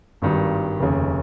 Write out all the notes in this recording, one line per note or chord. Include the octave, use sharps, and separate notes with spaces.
G#1 G2 D#3 G3
F1 D#2 C#3